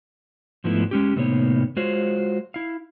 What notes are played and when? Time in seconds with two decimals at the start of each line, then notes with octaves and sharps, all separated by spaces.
0.64 G#2 F3 A3 B3 E4
0.91 G#3 C#4 G4
1.16 A2 C3 D#3 A#3 B3 C#5
1.76 G#3 F4 F#4 C5 C#5 F5
2.54 E4 F5